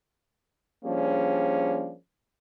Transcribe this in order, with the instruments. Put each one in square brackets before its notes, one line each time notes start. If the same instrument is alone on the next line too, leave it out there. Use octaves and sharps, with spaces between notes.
[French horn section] F3 G3 A#3 C#4 D4 G#4